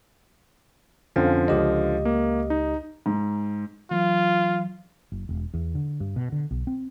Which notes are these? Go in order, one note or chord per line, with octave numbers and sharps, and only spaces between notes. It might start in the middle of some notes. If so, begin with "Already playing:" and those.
F2 D3 F3 C#4 F5
C#2 G4 D#5
A#3
D#4
G#2
E3 F#3 F4
F#1
E1
E2
D3
G2
B2
D3
B1
C4